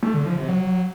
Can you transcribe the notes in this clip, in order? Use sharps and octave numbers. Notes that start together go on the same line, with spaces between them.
A3
D3
F3
C3
F#3